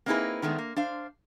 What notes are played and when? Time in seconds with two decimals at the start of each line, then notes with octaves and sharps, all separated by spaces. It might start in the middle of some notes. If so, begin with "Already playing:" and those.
0.06 A#3 C4 D#4 E4 G#4 B4
0.42 D#3 G#3 A3 B3 D4
0.58 A#3
0.76 D4 C5 F5